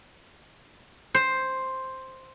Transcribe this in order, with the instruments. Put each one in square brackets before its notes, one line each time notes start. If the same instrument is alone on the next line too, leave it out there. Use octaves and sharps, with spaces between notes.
[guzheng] C5